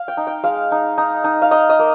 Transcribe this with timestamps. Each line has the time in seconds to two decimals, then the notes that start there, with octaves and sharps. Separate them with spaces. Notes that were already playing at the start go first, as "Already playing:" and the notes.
Already playing: F5
0.08 G5
0.17 D#4
0.27 G5
0.44 G#3 F5
0.72 D#4
0.98 D#4
1.24 D#4
1.42 F5
1.51 D#4 D#5
1.69 D#5
1.79 A#3